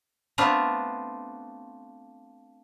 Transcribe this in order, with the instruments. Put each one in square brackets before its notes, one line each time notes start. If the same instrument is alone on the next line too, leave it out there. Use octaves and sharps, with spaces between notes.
[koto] A3 B3 C4 D4 F4